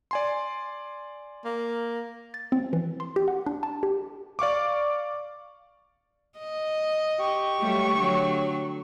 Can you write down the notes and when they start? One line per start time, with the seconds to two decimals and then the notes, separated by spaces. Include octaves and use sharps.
0.11 D5 G#5 C6
1.45 A#3
2.34 A6
2.52 C4
2.73 E3
3.00 C6
3.16 G4
3.28 F#5
3.46 D4
3.63 A5
3.83 G4
4.39 D5 F5 C#6 D6
6.38 D#5
7.19 G4 C#6
7.60 F#3 G3 A3
7.94 D3 F#3